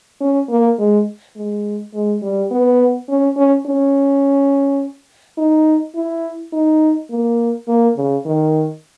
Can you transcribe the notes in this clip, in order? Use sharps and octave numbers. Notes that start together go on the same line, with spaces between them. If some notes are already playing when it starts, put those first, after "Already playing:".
C#4
A#3
G#3
G#3
G#3
G3
B3
C#4
C#4
C#4
D#4
E4
D#4
A#3
A#3
C#3
D#3